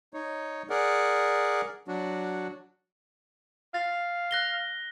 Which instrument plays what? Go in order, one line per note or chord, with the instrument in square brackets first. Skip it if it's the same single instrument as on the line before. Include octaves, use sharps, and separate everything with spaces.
[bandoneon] D#4 C#5
G#4 A#4 D5 F#5
F#3 D4 F#4
[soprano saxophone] F5 [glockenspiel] A6
[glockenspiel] F#6 A#6 G7